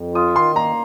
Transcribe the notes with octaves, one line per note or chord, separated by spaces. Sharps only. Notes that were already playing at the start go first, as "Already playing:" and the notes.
Already playing: F2
F4 D#6
D#3 C6
A#3 A#5